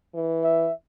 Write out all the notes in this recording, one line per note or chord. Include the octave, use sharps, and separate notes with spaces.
E3
E5